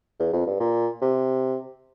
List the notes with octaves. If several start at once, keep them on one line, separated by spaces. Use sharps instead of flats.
E2
F2
G2
A#2
C3